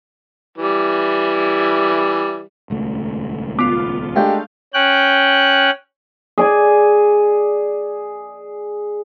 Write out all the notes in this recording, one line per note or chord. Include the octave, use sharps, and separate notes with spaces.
E3 G3 E4
D#1 C#2 A3
B3 F4 D6
G#3 A3 D4 G4 F5 G6
C#4 G5 F#6
G#4 D5 G#5